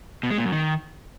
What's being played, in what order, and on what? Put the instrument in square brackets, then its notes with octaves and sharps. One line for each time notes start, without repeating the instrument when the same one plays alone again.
[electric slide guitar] B2
G#3
A#2
F#2
D#3